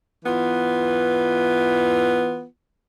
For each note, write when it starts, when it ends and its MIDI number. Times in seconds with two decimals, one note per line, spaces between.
0.25 2.44 52
0.25 2.44 59
0.25 2.44 65